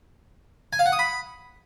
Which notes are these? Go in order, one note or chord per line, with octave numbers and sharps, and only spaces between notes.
G#5
F5
F#5
D#6
B5